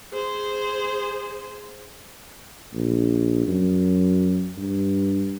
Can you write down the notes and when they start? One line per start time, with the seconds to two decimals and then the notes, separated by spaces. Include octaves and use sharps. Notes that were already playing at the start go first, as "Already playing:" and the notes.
0.13 G#4 C5
2.74 A#1
3.47 F#2
4.58 G2